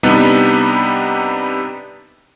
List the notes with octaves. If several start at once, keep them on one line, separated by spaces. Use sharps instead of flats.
C3 G3 B3 D4 D#4